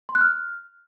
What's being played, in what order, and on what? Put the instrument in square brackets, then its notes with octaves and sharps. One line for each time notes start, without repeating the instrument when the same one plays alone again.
[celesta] C6
F#6
F6